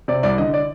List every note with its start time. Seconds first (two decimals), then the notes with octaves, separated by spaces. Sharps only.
0.08 C3 D5
0.23 C2 D5
0.38 D3 D#5
0.54 D5